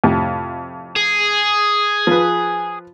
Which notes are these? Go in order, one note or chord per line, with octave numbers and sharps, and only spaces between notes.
F2 A2 C3
G#4
F3 B4